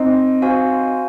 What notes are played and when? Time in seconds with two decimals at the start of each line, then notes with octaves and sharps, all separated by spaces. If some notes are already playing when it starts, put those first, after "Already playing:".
Already playing: C4 D#4
0.42 F#4 C5 F5 G#5